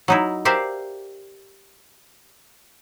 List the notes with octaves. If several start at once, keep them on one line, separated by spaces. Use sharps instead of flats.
F#3 D#4 E4
G4 A#4 C5 D5 E5 F5